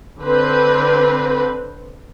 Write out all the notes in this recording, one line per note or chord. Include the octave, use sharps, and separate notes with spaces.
D3 C4 B4 C5